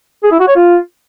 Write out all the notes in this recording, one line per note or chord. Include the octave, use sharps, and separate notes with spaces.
G#4
E4
F#4
C#5
F4